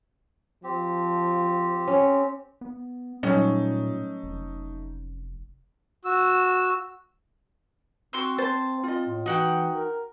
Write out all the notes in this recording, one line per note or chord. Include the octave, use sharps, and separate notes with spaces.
F3 C4 G4
C#4
B3
A#2 F#3 G3 A3 C#4 D#4 C#5
F1
F#4 E6
C4 F#4 C6 E6
C5 A5
F4 D#5
A2
E3 D#4 F#4 F#5 G5
A#4